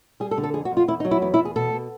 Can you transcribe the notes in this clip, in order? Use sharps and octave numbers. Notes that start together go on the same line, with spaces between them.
G3 G#4
A4
D3
A4
F2 G#4
F#4
F2
F4
E2 E4
D#4
F#3
E4
E2 E4
E4
E2
G#4
B2 A4
B2